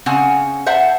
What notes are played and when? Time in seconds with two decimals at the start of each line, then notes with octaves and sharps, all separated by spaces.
0.06 C#3 C4 F#5 G#5
0.66 C5 E5 F#5 A5